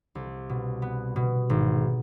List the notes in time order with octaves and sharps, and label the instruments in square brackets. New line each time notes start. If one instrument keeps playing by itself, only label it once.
[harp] C2
B2
B3
B2
G#1